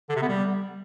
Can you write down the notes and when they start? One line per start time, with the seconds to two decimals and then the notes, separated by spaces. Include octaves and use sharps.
0.10 D3
0.16 C3
0.22 B3
0.28 G3